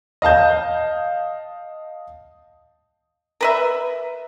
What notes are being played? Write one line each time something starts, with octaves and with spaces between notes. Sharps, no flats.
D#5 F5 A5 G6
A#4 B4 E5